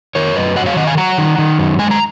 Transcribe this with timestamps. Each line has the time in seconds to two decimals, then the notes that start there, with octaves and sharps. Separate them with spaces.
0.15 D#3 A#4 C#5
0.36 F#2 B4 D#5
0.56 F#3 D#5 F#5
0.66 C#5 F5
0.76 D#3 D#5 F#5
0.87 F5 G#5
0.97 F#3 F#5 A#5
1.18 D#3
1.39 D#3
1.59 F#2
1.79 G#3 G#5
1.91 A#5